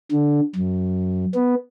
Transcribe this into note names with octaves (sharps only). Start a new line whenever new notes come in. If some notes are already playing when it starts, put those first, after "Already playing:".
D3
F#2
B3